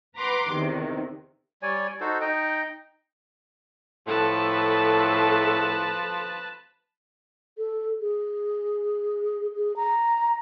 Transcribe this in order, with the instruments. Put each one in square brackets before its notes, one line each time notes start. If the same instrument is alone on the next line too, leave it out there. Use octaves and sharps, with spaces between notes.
[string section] B4 F#5 A#5 C6 D6
E2 C3 D#3
[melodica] G3 C#5 D5 G#5
D#4 F#4 A4 C5
D#4 D#5 G5
[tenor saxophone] A2 [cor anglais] F3 [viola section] A4 [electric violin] B4 A5
[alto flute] A4
G#4
G#4
A#5